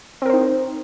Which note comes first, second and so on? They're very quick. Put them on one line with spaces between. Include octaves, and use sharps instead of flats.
C4 A#4 C5 D#4